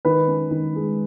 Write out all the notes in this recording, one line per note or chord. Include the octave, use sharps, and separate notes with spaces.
D#3 B4
C#4
D#3
G#3